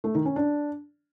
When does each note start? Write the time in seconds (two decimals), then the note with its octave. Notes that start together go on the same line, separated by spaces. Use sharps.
0.04 A3
0.15 D#3
0.25 C#4
0.36 D4